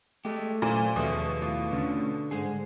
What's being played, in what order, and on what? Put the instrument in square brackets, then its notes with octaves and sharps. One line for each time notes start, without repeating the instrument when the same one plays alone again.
[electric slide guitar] G#3 G4 [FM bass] A3
[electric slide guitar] F#2 C5 [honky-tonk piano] A#2
[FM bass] D#2 [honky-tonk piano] B2 [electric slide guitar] F3 G#4 E5 [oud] A3 C#4 D#4
[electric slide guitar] A2 [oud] F4 D5
[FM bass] D3 [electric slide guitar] A3 C#4
[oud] G#2 G#3 C5 [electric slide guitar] G#4